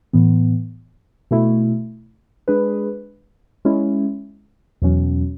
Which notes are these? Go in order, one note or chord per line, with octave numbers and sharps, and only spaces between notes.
A2 E3 B3
B2 A3 E4
G#3 D4 G#4 B4
G#3 C#4 E4
E2 B2 F#3 C#4